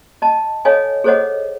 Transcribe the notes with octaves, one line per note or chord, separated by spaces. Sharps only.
D#5 A5
A4 C#5 D#5 F5 G#5
G#4 A4 C5 C#5 D#5 F#5